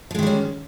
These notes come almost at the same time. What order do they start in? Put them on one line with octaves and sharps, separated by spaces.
F3 G#3 D#3 G3 C#4